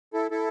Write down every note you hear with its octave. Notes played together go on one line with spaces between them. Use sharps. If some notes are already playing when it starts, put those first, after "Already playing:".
E4 A4
E4 A4